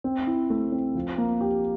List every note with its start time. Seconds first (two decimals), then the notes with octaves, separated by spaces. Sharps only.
0.04 C4
0.27 E4
0.50 A3
0.72 C4
0.95 F3
1.18 A#3
1.41 G4